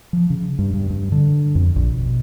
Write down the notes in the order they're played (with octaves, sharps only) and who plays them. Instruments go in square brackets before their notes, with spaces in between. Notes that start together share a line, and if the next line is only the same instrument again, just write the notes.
[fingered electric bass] F3
C#3
G2
G2
G2
D3
F2
A#1
B2